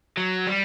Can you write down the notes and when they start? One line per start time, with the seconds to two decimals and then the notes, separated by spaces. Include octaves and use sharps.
0.17 F#3
0.47 G3